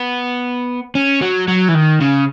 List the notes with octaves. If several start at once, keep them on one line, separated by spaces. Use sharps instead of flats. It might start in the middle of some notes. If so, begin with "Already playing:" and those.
Already playing: B3
C#4
F#3
F#3
E3
D#3
C#3